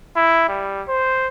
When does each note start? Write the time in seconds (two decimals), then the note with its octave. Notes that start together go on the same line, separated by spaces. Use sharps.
0.16 E4
0.49 G3
0.88 C5